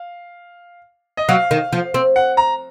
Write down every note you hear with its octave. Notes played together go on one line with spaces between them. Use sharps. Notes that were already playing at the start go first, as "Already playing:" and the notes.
Already playing: F5
D#5
F#3 F5
D#3
F3
C4
F#5
A#5